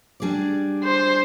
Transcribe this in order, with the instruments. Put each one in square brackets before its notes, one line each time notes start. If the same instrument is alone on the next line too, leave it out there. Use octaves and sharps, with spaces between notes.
[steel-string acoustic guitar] G3 D4 G#4 D5
[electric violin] C5